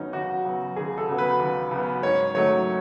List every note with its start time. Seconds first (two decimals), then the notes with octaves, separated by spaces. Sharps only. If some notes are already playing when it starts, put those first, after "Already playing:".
Already playing: D#2 C#3 F#3 B3 C#4 D#4
0.13 D#2 F#4
0.45 C#3 F#3 B3
0.76 D#2 G#4
0.98 A4
1.08 C#3 F#3 B3
1.18 B4
1.40 D#2
1.71 C#3 F#3 B3
2.03 G#2 C#5
2.35 D#3 F#3 A3 C#5